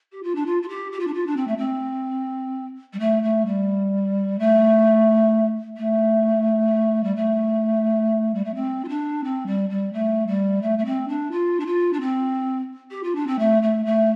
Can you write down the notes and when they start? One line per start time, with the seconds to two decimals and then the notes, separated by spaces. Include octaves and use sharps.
0.12 G4
0.23 F4
0.35 D4
0.46 F4
0.62 F4
0.68 G4
0.92 G4
0.99 F4
1.07 D4
1.14 F4
1.26 D4
1.36 C4
1.47 A3
1.57 C4
2.93 G3
2.99 A3
3.22 A3
3.46 G3
4.39 A3
5.77 A3
7.03 G3
7.16 A3
8.34 G3
8.44 A3
8.54 C4
8.84 F4
8.88 D4
9.24 C4
9.46 G3
9.69 G3
9.93 A3
10.27 G3
10.62 A3
10.78 A3
10.85 C4
11.08 D4
11.31 F4
11.60 D4
11.66 F4
11.93 D4
12.00 C4
12.90 G4
13.03 F4
13.15 D4
13.27 C4
13.39 A3
13.62 A3
13.85 A3